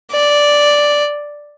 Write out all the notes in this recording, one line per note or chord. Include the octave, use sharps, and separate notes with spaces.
D5